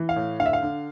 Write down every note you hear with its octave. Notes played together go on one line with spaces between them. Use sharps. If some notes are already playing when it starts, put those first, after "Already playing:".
Already playing: E3
F5
A2
D3 F5
E5
F5
D3